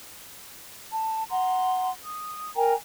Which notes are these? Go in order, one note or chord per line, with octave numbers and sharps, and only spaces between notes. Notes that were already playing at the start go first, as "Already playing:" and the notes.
A5
F#5 A#5 C6
D#6
A#4 G5 G#5 A#5